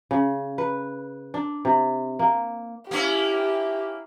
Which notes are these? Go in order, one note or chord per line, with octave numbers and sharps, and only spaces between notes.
C#3
B4
D4
C3
A#3
A#3 C#4 E4 G4